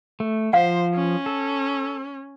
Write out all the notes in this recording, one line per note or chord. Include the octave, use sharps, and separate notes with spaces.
A3
F3 C5 F5 F#5
C#4
A4